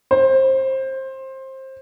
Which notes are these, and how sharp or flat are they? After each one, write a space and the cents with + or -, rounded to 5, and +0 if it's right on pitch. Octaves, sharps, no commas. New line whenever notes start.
C5 +20